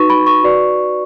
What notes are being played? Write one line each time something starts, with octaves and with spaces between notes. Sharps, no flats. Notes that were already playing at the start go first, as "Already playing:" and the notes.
Already playing: D#4 F#4 B4 C#6
B5
C#6
F#4 B4 D5